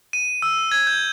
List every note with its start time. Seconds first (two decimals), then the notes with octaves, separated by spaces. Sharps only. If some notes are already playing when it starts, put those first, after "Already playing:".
0.13 D#7
0.42 E6
0.72 G#6
0.87 G6